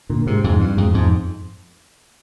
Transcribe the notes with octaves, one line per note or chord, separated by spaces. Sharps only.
A#2 D3
G#2 C3
F2 G#2
G2
F2 G#2
F2 G#2